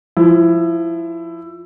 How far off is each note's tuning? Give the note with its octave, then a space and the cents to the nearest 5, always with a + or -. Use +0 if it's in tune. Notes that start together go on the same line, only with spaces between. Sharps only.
F3 +0 E4 +15